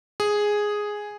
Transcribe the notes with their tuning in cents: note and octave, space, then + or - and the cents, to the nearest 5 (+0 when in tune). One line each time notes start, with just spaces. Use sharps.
G#4 +0